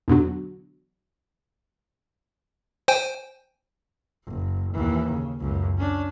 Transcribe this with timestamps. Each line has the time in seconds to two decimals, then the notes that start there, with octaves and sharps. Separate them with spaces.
0.08 E2 B2 D3 F#3
2.88 C5 G5 G#5
4.25 F#1
4.72 D#2 E3
5.11 C#3
5.40 C#2 F#2
5.78 C#4 D4